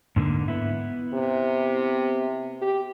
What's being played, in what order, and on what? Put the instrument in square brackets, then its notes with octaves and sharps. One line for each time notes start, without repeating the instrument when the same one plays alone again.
[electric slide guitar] G#2 D3 A#3
B3 E4
[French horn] C3
G4